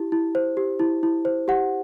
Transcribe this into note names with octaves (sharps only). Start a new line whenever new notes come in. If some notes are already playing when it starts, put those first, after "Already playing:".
Already playing: E4 G4
E4
C5
G4
E4
E4
C5
G4 F#5